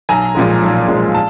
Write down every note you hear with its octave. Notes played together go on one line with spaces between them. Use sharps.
B1 G#5 A#5
A#2 F3 G#3
B1
A#2 F3 G#3
A5